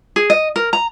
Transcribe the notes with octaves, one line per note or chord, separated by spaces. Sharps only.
G#4
D#5
A#4
A#5